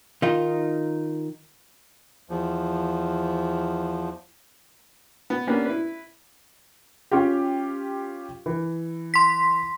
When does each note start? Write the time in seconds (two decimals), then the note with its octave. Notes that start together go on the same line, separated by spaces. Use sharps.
0.22 D#3 D#4 F4
2.29 E2 F3
5.30 B3
5.47 A#3 B3 C#4 D4 G4 B4
5.66 E4 B4
7.11 C#4 F4 G4
8.46 E3
9.14 C6 B6